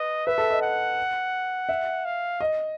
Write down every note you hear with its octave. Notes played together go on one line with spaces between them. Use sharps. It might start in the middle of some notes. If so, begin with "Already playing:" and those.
Already playing: B4 D#5
B4 E5
A4
D#5
F#5
E5
F5
D#5